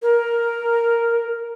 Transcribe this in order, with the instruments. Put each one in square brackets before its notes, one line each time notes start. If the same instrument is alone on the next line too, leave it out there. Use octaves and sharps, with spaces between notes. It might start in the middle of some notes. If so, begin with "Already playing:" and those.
[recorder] A#4